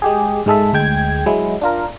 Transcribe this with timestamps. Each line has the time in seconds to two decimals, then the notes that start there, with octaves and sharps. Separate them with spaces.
0.02 G#3 G4 G#4
0.46 G#2 G#3 A4 E5
0.73 D2 G#3 G5 G#6
1.26 F#3 G#3 E4
1.61 D4 F4 A#4